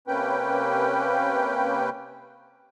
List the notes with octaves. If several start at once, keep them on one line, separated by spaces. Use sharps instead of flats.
C3 A#3 C#4 B4 G5